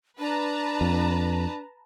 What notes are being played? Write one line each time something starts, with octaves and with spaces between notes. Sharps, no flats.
D4 B4 A5 A#5
F2